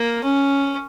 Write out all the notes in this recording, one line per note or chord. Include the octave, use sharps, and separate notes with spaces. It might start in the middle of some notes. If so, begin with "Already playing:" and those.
Already playing: A#3
C#4